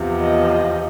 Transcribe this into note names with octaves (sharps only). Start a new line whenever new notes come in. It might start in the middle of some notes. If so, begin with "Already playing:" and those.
Already playing: E2 C3 F3
D#5